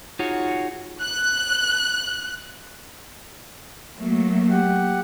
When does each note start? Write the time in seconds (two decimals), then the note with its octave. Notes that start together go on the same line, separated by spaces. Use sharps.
0.19 D#4 F4 F#4 G#4 C#5
1.02 F#6
3.97 F#3 A3 A#3
4.50 G4 F#5